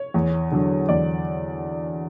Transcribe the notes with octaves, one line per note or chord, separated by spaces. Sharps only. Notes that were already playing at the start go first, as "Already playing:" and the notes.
Already playing: C#5
E2
D3 F#3
E2 D5